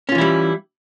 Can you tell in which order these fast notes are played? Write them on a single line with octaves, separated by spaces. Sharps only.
C#4 F4 E3 E4 G3